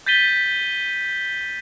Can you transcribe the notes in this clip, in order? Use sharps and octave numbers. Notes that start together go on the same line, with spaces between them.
G6 A6 B6 D#7 G7